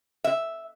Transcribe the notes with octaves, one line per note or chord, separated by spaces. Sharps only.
E5